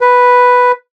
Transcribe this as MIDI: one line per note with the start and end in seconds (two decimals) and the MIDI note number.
0.01 0.72 71